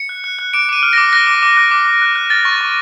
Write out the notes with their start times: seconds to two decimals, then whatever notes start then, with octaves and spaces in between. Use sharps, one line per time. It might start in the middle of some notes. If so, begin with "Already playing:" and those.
Already playing: C#7
0.09 F#6
0.24 F#6
0.39 F#6
0.53 D6 D7
0.69 D6 D#7
0.83 F6
0.93 D6 A#6
1.13 F#6 A#6
1.27 D6
1.43 D6
1.57 F#6
1.71 D6
1.86 D6
2.02 F#6
2.15 F#6
2.30 F6 A6
2.45 C#6
2.61 C#6